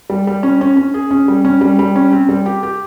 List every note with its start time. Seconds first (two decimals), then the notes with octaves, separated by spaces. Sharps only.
0.10 G3
0.27 G3
0.43 C#4
0.61 C#4
0.77 C#4
0.94 G#4
1.11 C#4
1.28 G3
1.45 C#4
1.61 G3
1.79 G3
1.96 C#4
2.13 C4
2.29 G3
2.46 G4
2.63 G4